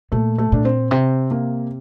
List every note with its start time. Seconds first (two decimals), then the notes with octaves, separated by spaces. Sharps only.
0.12 A#2 A3
0.38 A3
0.52 A#2 D4
0.65 C4
0.91 C3 C4
1.31 A#3